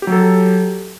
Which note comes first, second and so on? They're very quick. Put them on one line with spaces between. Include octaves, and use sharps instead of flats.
G4 F#3 A4